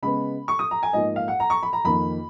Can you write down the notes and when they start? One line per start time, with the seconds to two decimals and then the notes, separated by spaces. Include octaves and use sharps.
0.02 C#3 G#3 B3 B5
0.48 C#6
0.59 D#6
0.71 A#5
0.83 G#5
0.93 G#2 F3 A#3 D#5
1.16 F5
1.28 F#5
1.40 A#5
1.50 C#6
1.63 B5
1.73 A#5
1.84 F2 D#3 A#3 B5